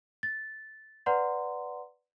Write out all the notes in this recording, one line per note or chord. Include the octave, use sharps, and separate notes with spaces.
A6
B4 D5 F#5 A#5 C6